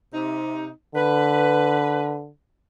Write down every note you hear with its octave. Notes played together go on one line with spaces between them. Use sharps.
C3 D#4
D3 B4